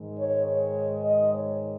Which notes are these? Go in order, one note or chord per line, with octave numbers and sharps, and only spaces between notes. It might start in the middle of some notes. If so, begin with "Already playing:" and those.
Already playing: G#2 D#3 G#3
C#5
C#5
D#5
C#5